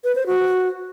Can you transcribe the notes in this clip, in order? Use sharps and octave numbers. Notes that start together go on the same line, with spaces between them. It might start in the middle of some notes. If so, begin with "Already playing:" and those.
B4
C5
F#4